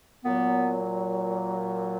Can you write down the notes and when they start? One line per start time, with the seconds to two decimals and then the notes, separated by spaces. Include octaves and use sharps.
0.25 A#2 F#3 B3